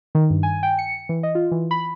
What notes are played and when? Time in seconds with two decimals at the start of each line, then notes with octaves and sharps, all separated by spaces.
0.15 D#3
0.30 G2
0.43 G#5
0.63 G5
0.78 C#7
1.09 E3
1.23 D#5
1.35 F4
1.51 E3
1.71 B5